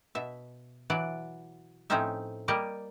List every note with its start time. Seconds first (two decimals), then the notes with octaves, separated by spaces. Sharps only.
0.15 B2 E5
0.90 E3 F#3 D5 F#5
1.90 A2 F3 C4 C#4 D#4 E5
2.48 G3 A#3 G4 D5 D#5